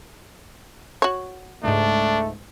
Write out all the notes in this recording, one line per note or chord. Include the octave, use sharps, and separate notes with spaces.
F#4 C#5
C#2 G#2 A3 D4